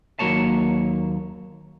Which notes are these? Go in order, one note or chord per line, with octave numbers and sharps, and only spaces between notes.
D#2 F#3 A#3 C#5 A5